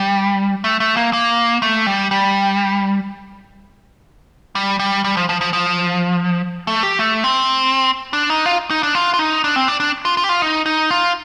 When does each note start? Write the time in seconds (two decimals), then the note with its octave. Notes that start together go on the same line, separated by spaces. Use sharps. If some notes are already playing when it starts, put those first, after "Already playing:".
Already playing: G3
0.64 A3
0.80 A3
0.97 A#3
1.13 A#3
1.62 A3
1.86 G3
2.11 G3
4.55 G3
4.79 G3
5.04 G3
5.17 F3
5.29 F3
5.41 F3
5.53 F3
6.67 A3
6.83 G4
6.99 A3
7.24 C4
8.13 D4
8.30 D#4
8.46 F4
8.70 D#4
8.83 D4
8.95 F4
9.14 F4
9.19 D#4
9.44 D4
9.56 C4
9.68 D4
9.80 D4
10.05 F4
10.17 F4
10.24 G4
10.29 F4
10.42 D#4
10.66 D#4
10.91 F4